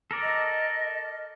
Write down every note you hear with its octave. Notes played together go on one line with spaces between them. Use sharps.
A4 A#4 D5
D#5